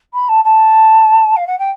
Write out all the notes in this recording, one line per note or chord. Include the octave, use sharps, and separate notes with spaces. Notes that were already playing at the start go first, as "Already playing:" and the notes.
B5
A5
A5
F5
F#5
G5